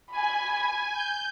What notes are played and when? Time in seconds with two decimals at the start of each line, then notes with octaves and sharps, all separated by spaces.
0.12 G#5 B5
0.92 G6